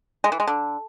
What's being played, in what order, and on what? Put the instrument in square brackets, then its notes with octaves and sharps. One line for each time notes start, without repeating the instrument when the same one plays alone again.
[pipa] G#3
E3
G#3
D3